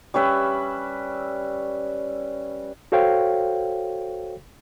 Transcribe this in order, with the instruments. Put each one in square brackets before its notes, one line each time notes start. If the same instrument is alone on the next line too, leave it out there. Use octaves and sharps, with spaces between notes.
[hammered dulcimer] G3 C#4 B4 E5
[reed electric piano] F#4 A4 C5 C#5 F5 G5